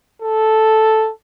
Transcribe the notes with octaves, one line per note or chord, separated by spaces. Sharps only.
A4